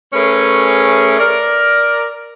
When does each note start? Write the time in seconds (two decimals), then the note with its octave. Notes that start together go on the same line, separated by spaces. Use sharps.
0.13 A3 C#4 G#4 A#4 B4 C#5
1.18 A#4 D5